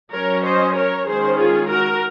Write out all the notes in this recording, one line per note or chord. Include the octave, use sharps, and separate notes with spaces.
F#3 C#4 A#4 C#5
C5 D#5
A#4 C#5
D#3 G#3 C#4 G#4 C5
F4 G#4
F#4 A#4